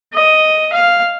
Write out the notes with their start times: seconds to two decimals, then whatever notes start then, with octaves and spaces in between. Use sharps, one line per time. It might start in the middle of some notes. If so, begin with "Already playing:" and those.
0.14 D#5
0.73 F5